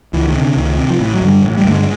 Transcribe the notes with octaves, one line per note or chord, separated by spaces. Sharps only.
C#2 E3
D#3
C3
D3
C#2 D#3
C3
F3
A1 E3
F#3
G2 D3
G3
A1
G3
G2 D3 A3
G#3